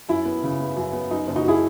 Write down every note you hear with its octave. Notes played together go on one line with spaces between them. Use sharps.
F#2 E4
B3
C#3
B3
F#2
B3
F#2 D#4
F#1
D#4 F#4
F#3 E4 G#4